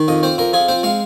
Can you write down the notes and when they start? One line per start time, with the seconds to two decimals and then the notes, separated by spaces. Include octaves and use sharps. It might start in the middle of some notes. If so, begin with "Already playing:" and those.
Already playing: D#3
0.08 F2 D#5
0.23 C4 C5
0.38 F2 A#4
0.53 F3 G#4
0.68 C4 C5
0.83 G#3 F5